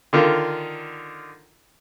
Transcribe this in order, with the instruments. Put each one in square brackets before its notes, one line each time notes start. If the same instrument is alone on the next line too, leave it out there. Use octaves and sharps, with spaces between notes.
[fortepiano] D3 D#3 F4